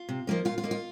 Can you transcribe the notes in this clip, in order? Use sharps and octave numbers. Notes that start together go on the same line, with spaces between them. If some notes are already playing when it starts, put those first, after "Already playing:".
Already playing: F4
C3
F3 A#3 D#4
A#2 F4
F4
A#3 D#4
F4